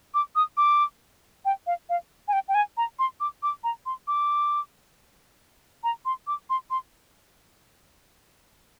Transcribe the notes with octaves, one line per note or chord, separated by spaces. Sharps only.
D6
D#6
D6
G5
F5
F5
G#5
G5
G5
G#5
A#5
C6
D6
D6
A#5
C6
D6
A#5
C6
D6
C6
C6